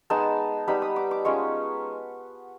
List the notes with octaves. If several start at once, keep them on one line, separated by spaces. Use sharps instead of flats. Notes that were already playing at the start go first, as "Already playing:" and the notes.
G#3 B3 D#4 A5
G3 B3 D#4 B5
D#6
D6
D6
G#3 C#4 F4 C#6